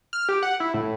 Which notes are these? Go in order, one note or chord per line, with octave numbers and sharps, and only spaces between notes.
F6
G4
F#5
E4
A2